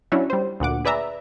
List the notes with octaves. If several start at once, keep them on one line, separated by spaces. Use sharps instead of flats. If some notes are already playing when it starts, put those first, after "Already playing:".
F#3 C#4 D4 E4 F#4
G3 C5
D2 A#2 F#5 D6
G#4 B4 D5 E5 A#5